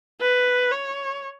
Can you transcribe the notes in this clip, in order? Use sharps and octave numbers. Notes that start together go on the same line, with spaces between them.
B4
C#5